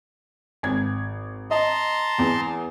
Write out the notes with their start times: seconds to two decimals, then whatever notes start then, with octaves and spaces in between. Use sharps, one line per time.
0.63 G#1 G#6
1.51 D#5 A5 A#5 C6
2.18 E2